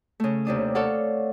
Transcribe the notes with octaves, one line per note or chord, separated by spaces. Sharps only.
C#3 A3
D#2 C3 D4 D#6
A4 C#5 D5 F5 F#5